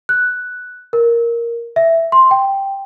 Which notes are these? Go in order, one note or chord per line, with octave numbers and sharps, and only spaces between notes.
F#6
A#4
E5
C6
G5